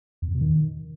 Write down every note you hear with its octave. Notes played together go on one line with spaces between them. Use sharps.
E2
F2
B2
D#3